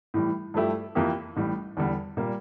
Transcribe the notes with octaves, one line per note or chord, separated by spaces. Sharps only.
A2 E3 G3
G2 F3 A3 E4 G4
F2 E3 A#3 E4 G4
A1 A2 G3
E2 D3 G3
A#2 G3 A#3